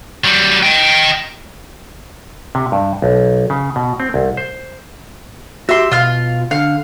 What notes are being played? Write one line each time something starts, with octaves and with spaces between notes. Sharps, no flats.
F#3 G3
D#5 G5
C3
G2
B1
C#3
B2
C4
C2
C5
F#4 G4 E5 C6
B2 F4 F5
D3 F5